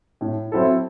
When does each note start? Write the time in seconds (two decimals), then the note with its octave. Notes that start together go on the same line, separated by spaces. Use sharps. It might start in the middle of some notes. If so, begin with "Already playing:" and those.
0.21 A2
0.52 F#3 C4 E4 A4